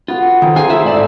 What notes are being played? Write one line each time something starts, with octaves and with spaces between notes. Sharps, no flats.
B3 F4 F#4 A4
D#3 C4 D#4
F4 G#4 G#5
A2 E4 E5
G#2 D5 A5